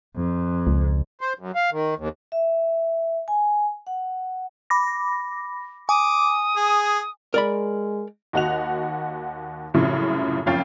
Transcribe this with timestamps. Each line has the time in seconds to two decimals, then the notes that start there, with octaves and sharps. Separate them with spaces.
0.16 F2
0.67 C#2
1.21 C5
1.39 F#2
1.55 F5
1.72 D#3
1.98 D#2
2.32 E5
3.28 G#5
3.87 F#5
4.70 B5 D6 A#6
5.89 G#5 D6 D#6
6.56 G#4
7.34 G#3 A#4 D5 B5
8.33 D#2 D#4 F#4 F#5 F#6 F7
9.74 C2 F#2 A2 C#3 F3
10.46 F#1 F2 C#4 F5 G5 A6